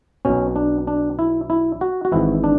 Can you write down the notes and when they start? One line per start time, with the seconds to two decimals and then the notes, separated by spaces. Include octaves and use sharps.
0.25 B1 B2 C#4
0.56 D4
0.87 D4
1.19 E4
1.50 E4
1.81 F#4
2.05 F#4
2.12 G#1 G#2 E3 E4
2.44 D4